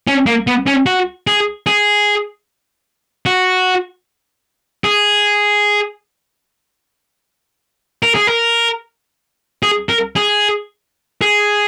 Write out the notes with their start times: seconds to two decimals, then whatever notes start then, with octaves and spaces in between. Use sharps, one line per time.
0.07 C#4
0.26 A#3
0.47 B3
0.67 C#4
0.86 F#4
1.27 G#4
1.67 G#4
3.26 F#4
4.84 G#4
8.03 A#4
8.15 G#4
8.27 A#4
9.63 G#4
9.89 A#4
10.16 G#4
11.21 G#4